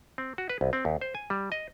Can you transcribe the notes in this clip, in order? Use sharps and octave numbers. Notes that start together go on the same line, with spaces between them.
C4
F#4
B4
C2
C4
D#2
C5
G#5
G3
D#5